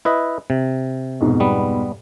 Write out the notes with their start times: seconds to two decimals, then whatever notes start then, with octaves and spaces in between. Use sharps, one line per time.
0.05 E4 B4 D#5
0.50 C3
1.20 F2 G#2 B2
1.40 G3 B3